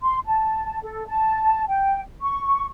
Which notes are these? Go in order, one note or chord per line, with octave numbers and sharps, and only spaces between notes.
C6
A5
A4
A5
G5
C#6